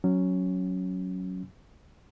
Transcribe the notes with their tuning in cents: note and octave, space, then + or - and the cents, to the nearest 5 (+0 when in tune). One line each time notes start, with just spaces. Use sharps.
F#3 +0 C#4 +0